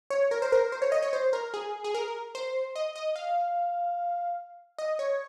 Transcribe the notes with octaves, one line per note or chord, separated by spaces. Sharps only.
C#5
A#4
C5
A#4
C5
C#5
D#5
C#5
C5
A#4
G#4
G#4
A#4
C5
D#5
D#5
F5
D#5
C#5